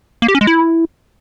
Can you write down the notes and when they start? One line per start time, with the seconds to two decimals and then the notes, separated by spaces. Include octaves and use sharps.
0.22 A#3
0.28 G4
0.35 C#4
0.41 G#3
0.47 E4